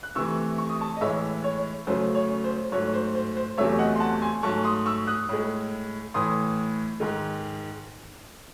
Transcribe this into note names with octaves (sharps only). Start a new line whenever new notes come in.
F#6
C3 E3 A3 C#6 E6
C#6
D#6
A5 C#6
D#5
A2 E3 G#3 C#5 E5
C#5
F#2 C#3 F#3 A3 C5
C#5
C5
G#2 F#3 A3 C#5
C5
C5
C5
E2 C3 F#3 A3 C#5 E5
D#5 F#5
C6
F#5 A5
G#5 C6
G#2 F#3 A3 A5 C#6
C6 D#6
C#6 E6
D#6 F#6
A2 G#3
A2 E3 A3 C6 D#6
G#2 D#3 G#3